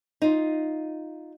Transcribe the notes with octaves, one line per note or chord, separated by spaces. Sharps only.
D#4 F4